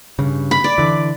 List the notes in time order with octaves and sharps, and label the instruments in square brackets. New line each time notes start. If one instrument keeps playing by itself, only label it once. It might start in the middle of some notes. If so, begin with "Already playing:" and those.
[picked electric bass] G2 C#3
[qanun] B5
D5
[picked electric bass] D3 E3